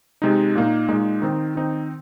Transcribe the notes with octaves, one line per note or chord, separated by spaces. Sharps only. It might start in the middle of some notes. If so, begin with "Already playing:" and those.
C3 G#3 D#4
A#2 A#3 D#4
A#2 G#3 D#4
D#3 C4 D#4
D#3 C4 D#4